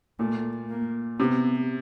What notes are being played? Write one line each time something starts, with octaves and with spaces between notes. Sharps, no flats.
A#2 A3
A#3
C3 B3